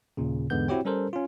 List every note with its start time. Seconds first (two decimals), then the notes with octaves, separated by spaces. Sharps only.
0.17 D#2 A#2 C#3
0.50 E2 G#2 D3 G#3 B3 G6
0.68 C4 E4 F#4 G4 C#5 G5
0.85 G3 C#4 A4 A#4 C5
1.13 C#4 F4